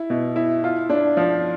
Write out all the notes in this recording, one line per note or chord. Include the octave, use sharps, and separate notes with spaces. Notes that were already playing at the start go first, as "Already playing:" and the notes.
Already playing: E4
B2
E4
F4
D4
F3